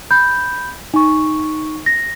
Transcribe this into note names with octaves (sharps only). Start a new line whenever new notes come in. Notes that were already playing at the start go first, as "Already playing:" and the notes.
B5 G6
D#4 C#6
A#6